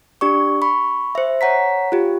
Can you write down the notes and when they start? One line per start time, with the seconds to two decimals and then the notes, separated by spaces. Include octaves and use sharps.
0.21 D4 G4 D5 C#6
0.62 B5 C#6
1.15 C5 E5
1.41 C#5 F#5 A#5 B6
1.92 F4 G4